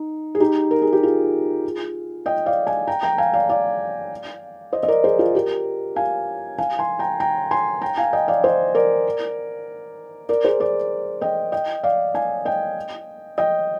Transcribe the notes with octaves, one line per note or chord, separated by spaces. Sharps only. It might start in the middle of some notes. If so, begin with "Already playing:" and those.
Already playing: D#4
G#4
D#4 G4
A#4
G#4
G4
F4 G#4
D#5 G5
D5 F5
F5 G#5
G5 A#5
G5 A#5
F5 G#5
D5 F5
D5 F5
C5 D#5
D#5
A#4 D5
G#4 C5
F4 G#4
G4 A#4
F5 G#5
F5 G#5
G#5 C6
G5 A#5
G5 A#5
G#5 C6
G5 A#5
F5 G#5
D#5 G5
D5 F5
C5 D#5
A#4 D5
A#4 D5
G#4 C5
A#4 D5
D#5 G5
D#5 G5
D5 F5
F5 G#5
D#5 G5
D#5 G5